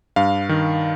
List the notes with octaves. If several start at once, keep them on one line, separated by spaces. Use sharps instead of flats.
G2 F5
D#3